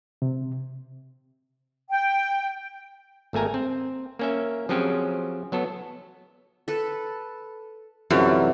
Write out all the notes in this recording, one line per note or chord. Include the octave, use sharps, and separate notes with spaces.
C3
G5
G#1 A3 A#3 G#5 A#5
C4
A#3 C#4 E5
F3 F#3 C4 C#4 G4 G#4
F#3 B3 A4
A4 B4
F#2 C3 E3 F#3 G3 A3 F4